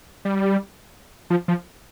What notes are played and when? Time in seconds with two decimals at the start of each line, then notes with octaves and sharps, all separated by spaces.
0.25 G3
1.30 F3
1.48 F3